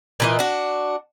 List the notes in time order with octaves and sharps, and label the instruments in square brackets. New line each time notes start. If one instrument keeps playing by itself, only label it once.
[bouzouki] A#2 E3 D#5
D4 F#4